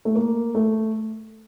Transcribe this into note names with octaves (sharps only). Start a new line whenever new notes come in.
A3
A#3
A3